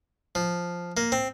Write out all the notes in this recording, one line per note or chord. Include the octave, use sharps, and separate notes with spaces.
F3
A#3
C4